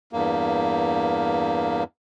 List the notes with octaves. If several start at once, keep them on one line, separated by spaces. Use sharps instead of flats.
E2 G2 A#3